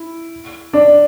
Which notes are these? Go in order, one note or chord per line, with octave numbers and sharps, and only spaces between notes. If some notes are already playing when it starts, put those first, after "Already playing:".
Already playing: E4
D4 D5